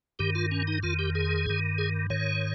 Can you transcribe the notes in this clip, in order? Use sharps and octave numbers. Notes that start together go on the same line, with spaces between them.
G2 D#3 G4
F4
C#4
D#4
F2 D#3 F4
G4
G#4
G2 D#3
G#4
G#2 D#3 C#5